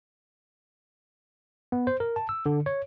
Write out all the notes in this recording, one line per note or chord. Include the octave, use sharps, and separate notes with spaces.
B3
C5
A#4
A5
E6
D3
C#5